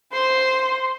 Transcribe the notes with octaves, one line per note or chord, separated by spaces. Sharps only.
C5 C6